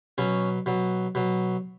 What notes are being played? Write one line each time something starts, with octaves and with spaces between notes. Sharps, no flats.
B2 F#3 C#4
B2 F#3
B2 F#3